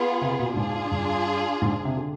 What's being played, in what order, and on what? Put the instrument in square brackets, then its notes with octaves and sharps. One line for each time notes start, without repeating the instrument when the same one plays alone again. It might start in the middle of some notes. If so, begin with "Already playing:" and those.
Already playing: [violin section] B3 F4 G#4
[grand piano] C3
B2
[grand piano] G#2 [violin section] D4 F4 G#4
[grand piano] G2
G#2
C3
D3